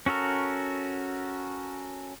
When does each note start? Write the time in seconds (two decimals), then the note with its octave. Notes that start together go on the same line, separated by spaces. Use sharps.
0.06 C#4 F#4 A4 A#4